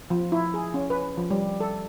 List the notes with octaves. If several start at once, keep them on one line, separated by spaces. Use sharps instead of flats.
F3
E4
G#4
C#4
B4
F3
G3
A4